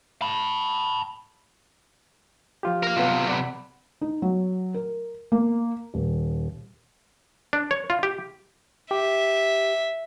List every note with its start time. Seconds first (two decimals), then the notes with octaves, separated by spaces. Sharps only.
0.22 A5 B5
2.63 F3 F4 G4
2.83 A#4 F5
2.97 B1 C3 B3 F4
3.29 D5 F#5 B5
4.01 D#4
4.22 F#3
4.74 A#4
5.32 A#3
5.94 D#1
7.53 D4
7.71 C#5
7.90 F4
8.03 G4
8.91 G4 E5